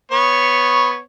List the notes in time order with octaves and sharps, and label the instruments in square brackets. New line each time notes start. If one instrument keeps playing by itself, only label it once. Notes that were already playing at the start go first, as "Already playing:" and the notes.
[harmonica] B3 C#5